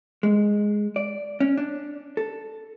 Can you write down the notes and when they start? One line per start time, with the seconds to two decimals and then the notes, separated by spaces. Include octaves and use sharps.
0.23 G#3
0.96 D5
1.40 C#4
1.57 D4
2.17 A4